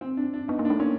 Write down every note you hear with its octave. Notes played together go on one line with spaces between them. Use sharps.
C4
D4
D4
B3 D#4
A#3
D4
A3
A#3 C#4